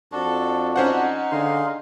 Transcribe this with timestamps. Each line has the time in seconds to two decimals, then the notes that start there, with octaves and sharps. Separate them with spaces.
0.12 F2 D4 F#4 A4
0.76 C#4 D#4 C5 F#5
1.32 D3 G#4 F5 C6